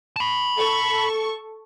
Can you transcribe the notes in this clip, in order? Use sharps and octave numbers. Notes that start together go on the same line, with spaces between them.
A5 B5
A4 C#6